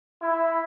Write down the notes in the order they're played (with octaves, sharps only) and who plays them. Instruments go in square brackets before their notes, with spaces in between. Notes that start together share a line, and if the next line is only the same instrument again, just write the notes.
[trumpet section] E4